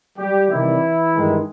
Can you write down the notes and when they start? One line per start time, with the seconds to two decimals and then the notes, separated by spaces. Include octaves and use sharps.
0.18 G3 G4
0.50 C3 D#3 E3 G3 E4
1.14 G2 D#3 G#3